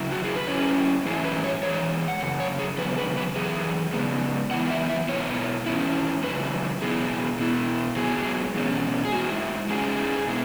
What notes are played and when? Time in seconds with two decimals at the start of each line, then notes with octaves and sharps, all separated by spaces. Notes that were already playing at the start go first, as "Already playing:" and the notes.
Already playing: C#3 F#3 E4
0.12 F#4
0.24 G#4
0.36 B4
0.47 F#2 F#3 C#4 E4 C#5
1.05 G#2 E3 C#4 E4 G#4
1.25 B4
1.44 C#5
1.63 E2 E3 G#3 C#5
2.08 F#5
2.20 F#2 C#3
2.40 C#5
2.59 G#4
2.78 E2 C#3 F#3 B3 B4
2.98 B4
3.17 B4
3.36 F#2 C#3 E3 G#4
3.93 C#3 G#3 B3
4.51 F#2 E3 B3 E4 F#5
4.70 E5
4.89 E5
5.09 B2 B3 E4 C#5
5.66 G#2 E3 C#4 E4
6.23 E2 C#3 F#3 E4 B4
6.81 B2 B3 E4 G#4
7.39 B2 B3 E4
7.96 G#2 F#3 B3 G#4
8.54 E2 B2 G#3 C#4
9.05 G#4
9.12 G#2 G#3 E4 F#4
9.70 G#2 G#3 C#4 E4 G#4
10.27 B2 B3 E4